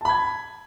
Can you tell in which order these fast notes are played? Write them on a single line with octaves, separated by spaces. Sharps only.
A5 B5 G#6